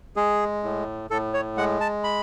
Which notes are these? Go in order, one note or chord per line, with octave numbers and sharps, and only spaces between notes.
G#3 G#4
A2
A2 A4
C#5
G#3 F#5
A5
B5